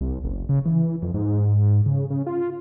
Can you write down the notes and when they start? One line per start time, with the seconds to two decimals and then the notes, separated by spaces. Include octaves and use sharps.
0.01 C2
0.24 F#1
0.49 C#3
0.66 E3
1.02 F2
1.14 G#2
1.86 C#3
2.10 C#3
2.27 F4